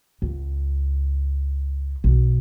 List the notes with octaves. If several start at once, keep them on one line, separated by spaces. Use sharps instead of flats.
C#2
B1